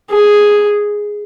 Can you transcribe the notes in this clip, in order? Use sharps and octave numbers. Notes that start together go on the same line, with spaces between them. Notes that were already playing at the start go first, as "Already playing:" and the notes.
G#4